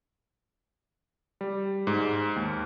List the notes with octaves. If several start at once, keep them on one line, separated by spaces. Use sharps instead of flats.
G3
G#2
D#2